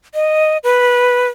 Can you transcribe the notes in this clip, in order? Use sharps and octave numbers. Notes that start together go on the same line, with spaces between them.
D#5
B4